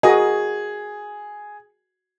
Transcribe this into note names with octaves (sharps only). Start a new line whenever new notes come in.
F#4 G#4 A#4 D#5